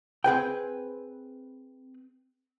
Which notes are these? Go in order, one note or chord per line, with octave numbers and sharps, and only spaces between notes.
C4 G#4 B4 G5